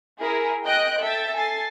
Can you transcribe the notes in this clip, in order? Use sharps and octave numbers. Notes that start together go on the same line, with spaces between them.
E4 G#4 A#4
D#5 G5 F#6 G6 D7
A4 E5 G5 A6
A4 G#5 A6 C7